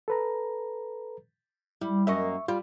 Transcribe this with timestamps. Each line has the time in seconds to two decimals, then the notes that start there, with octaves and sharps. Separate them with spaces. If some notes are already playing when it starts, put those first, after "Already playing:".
0.08 A4 B4 A#5
1.81 G3 E4
2.07 F#2 A#3 D#5 E5 C#6
2.48 G3 F4